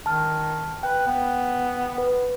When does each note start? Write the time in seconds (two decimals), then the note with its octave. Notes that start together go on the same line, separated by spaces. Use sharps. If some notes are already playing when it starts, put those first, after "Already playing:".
0.06 D#3 A5 F6
0.83 B4 G5
1.07 B3
1.98 B4